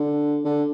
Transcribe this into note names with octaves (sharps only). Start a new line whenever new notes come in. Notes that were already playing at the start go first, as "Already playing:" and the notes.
Already playing: D3
D3